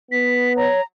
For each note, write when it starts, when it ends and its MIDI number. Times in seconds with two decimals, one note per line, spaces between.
0.12 0.68 59
0.12 0.53 95
0.57 0.81 73
0.57 0.83 82